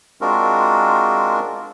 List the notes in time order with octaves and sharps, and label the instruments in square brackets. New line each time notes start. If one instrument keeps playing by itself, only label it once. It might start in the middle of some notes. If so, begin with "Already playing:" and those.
[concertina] G#3 C4 D4 F4 F#4 A#4